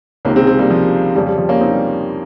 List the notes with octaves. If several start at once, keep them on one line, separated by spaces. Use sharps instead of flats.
C#2 C3 D#3 A#3 C#4
G#3 C4
G#3 C4
G3 A#3
F3
F2 C#3 F3 G3
G3
F3
A#3 C#4
C4 D#4
G3